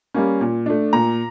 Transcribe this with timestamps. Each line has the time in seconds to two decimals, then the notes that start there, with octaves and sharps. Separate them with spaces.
0.14 G3 A#3 C#4
0.41 A#2
0.66 A3 D4
0.93 A#2 A#5